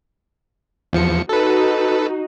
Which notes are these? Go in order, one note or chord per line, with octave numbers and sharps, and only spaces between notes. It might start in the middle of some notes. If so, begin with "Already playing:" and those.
E2 F3 C#7
D#4 F#4 A4 B4